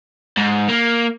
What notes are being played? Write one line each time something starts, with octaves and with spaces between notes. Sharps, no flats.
G#2
A#3